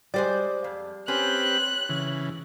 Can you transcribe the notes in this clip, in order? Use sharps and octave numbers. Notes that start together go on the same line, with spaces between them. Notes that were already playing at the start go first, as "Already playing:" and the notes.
G3 G#3 C5 D5
F2
C4 C#4 G4 B4 F#6
C#3 E3